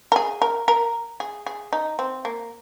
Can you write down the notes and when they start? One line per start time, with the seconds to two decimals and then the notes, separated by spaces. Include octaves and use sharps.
0.12 A#4
0.16 G#4
0.42 A#4
0.68 A#4
1.20 G#4
1.46 G#4
1.73 D#4
1.99 C4
2.25 A#3